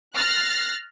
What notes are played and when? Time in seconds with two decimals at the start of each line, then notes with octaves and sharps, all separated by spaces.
0.15 F6 F#6 A6 A#6 C7